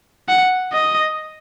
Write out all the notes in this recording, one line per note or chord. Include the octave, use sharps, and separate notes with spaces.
F#5
D#5